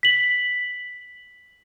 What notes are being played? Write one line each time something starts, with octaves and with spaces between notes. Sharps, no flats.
B6 F#7